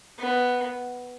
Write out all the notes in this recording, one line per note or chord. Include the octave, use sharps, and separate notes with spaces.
B3